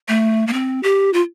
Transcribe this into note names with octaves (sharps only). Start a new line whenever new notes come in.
A3
A#3
C4
G4
F4